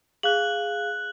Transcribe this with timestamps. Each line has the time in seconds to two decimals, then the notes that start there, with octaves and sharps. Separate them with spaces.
0.23 G#4 F5 F#6 F#7